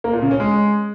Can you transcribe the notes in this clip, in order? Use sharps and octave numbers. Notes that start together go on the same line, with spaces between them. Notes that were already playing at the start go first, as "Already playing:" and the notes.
A#3
A#2
C#3
C#4
G#3